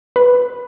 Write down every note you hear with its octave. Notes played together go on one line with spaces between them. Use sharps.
B4